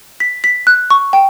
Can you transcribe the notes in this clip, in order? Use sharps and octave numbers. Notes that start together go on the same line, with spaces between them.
B6
B6
F#6
C#6
G5